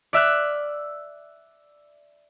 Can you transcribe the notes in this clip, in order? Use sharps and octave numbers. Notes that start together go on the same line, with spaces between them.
D5 E5 F6 F#6